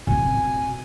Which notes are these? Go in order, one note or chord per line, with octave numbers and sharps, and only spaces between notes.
B2 C4 G#5